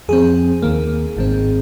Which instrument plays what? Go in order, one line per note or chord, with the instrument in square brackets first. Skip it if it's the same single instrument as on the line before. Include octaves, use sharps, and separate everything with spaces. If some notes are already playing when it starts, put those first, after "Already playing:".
[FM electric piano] F2 F3 C4 G#4
D#2 D#3 A#3
G#1 G#2 D#3 C4